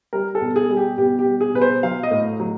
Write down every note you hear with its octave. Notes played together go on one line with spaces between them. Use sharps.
G3 A#4
A4
B2
G#4
G3
G4
B2 G4
G4
G3
G#4
B2 B4
C5
F#3 F5
D#5
A2
F#3